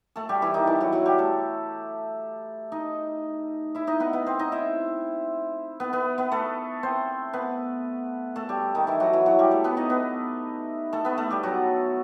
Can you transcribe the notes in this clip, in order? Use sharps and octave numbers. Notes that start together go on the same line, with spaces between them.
A3 A4
G3 G4
E3 E4
D#3 D#4
E3 E4
F#3 F#4
F#3 F#4
G3 G4
A3 A4
D#4 D#5
E4 E5
D#4 D#5
B3 B4
B3 B4
C4 C5
D#4 D#5
E4 E5
B3 B4
B3 B4
B3 B4
A3 A4
C4 C5
B3 B4
A3 A4
G3 G4
D#3 D#4
E3 E4
F#3 F#4
E3 E4
F#3 F#4
G3 G4
A3 A4
B3 B4
D#4 D#5
B3 B4
A3 A4
B3 B4
A3 A4
G3 G4
F#3 F#4